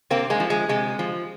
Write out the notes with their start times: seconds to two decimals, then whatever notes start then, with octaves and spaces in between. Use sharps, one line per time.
0.10 C3 A#3 C4
0.30 G#3 A#3
0.40 F3
0.50 G#3
0.69 C3 G#3
0.99 F3